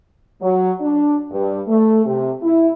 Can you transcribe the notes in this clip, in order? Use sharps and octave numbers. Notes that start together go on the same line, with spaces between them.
F#3
D4
G2
A3
C3
E4